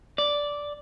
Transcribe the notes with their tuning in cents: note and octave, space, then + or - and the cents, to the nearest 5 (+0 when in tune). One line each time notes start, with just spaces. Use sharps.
D5 -5